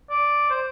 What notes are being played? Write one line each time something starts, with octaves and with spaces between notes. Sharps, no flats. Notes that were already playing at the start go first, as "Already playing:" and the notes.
D5
C5